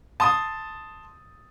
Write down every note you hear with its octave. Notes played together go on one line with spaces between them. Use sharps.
A5 C6 D#6